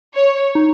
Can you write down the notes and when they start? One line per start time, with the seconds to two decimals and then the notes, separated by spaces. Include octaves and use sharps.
0.15 C#5
0.55 D#4